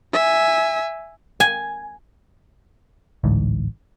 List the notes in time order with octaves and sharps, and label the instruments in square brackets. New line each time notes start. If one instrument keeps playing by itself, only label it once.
[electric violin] E5 G#5
[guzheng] G#5
[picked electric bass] A1 D2 G#2